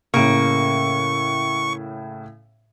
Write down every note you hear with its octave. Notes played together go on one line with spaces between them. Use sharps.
A2 C#3 A#3 C#6